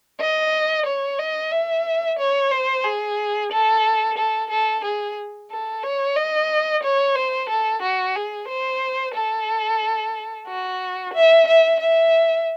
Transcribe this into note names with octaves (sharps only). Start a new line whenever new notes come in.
D#5
C#5
D#5
E5
C#5
C5
G#4
A4
A4
A4
G#4
A4
C#5
D#5
C#5
C5
A4
F#4
G#4
C5
A4
F#4
E5
E5
E5